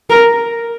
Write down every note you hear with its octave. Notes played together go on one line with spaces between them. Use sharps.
A#4